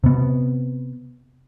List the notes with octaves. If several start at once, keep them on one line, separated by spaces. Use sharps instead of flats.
C3 B3